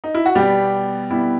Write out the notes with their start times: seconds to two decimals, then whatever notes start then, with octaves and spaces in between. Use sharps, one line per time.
0.04 D#4
0.15 E4
0.26 F#4
0.35 B2 G3 B3 G4
1.10 B2 G3 B3 E4